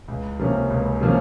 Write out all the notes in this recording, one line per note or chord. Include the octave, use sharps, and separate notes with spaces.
C#2
C3 F3 A#3 C#4
C#2
C3 F3 A#3 C#4